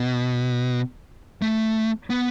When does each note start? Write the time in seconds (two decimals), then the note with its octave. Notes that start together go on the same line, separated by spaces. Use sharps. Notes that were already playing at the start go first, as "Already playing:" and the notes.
Already playing: B2
1.42 A3
2.10 B3